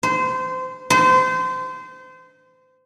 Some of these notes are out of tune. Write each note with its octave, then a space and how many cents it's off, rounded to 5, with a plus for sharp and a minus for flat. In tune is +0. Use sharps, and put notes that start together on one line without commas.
C5 -25
C5 -30